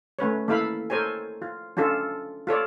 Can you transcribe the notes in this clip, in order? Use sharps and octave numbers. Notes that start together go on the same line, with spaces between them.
A3 C#4 B4 C#5
A#3 E4 A4 F5 B5
A4 A#4 C5 C#5 G#5
F4
C#4 D4 F4 A4
F4 A4 C#5 D5